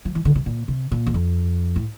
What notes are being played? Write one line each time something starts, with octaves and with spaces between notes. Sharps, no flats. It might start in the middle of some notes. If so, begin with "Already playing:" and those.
F3
E3
D3
C3
A#2
C3
A#2
E2
F2
A2